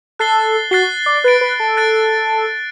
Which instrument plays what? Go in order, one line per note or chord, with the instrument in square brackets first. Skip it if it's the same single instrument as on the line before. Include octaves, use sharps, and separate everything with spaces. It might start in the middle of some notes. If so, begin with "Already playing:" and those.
[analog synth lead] A4 [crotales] F#6 A6 C7 G7
[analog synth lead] F#4 [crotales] F#6 A6 C7 G7
[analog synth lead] D5
[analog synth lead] B4 [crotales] F#6 A6 D7
[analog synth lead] B4
A4
[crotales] F#6 A6 D7